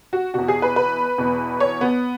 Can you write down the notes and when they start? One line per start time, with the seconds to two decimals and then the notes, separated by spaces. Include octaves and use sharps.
0.13 F#4
0.34 E2 B2 F#4
0.48 G#4
0.62 B4
0.76 B4
1.18 E2 B2
1.60 C#5
1.81 B3